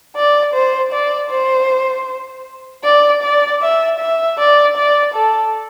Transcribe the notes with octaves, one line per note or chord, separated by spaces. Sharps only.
D5
C5
D5
C5
D5
D5
E5
E5
D5
D5
A4